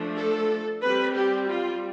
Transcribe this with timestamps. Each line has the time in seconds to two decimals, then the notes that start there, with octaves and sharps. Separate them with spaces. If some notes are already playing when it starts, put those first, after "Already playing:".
Already playing: F3 A3 D4
0.16 A4
0.82 G3 C4 B4
1.15 G4
1.48 F4